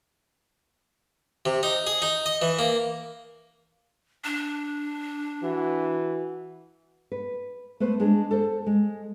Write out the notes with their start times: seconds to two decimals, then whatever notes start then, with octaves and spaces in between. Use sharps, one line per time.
1.45 C3
1.63 D#4
1.87 G#4
2.02 D#4
2.26 D#5
2.42 E3
2.59 A#3
4.25 D4
5.43 E3 F#4
7.12 B4
7.80 A3 B3 B4 C5
8.00 G#3 D4 G#4
8.31 A4 C5
8.66 G#3